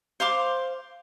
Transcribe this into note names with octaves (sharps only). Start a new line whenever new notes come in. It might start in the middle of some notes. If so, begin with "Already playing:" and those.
C5 F5 C6 D6